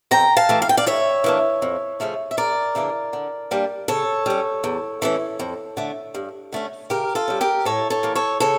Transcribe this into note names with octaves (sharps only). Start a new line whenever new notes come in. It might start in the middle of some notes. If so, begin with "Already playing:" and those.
F2 G5 A#5
F5 A5
E3 A3
F5
G5
D5 F5
A2 C#5 E5
E3 A#3 D4
F2
C#3 F3 A3 C#4
E5
E2 A#4 D5
C#3 E3 A#3 D4
D3
G3 A#3 D4
C#3 A4 C#5
G3 C#4
E2
E3 A3 C#4
F2
D3 A3
G2
D3 A3 C#4
C#3 G4 A#4
F4 A4
G3 C#4
G4 A#4
A2 A4 C#5
A4 C#5
E3 A#3
A4 C#5
C#3 A4 C#5